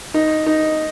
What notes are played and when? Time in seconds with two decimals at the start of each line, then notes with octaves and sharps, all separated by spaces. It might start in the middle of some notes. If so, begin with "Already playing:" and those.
0.14 D#4
0.46 D#4